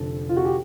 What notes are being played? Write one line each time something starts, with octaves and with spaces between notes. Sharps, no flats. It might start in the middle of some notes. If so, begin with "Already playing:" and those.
Already playing: F1 F2 D3 A4
F4
F#4
G4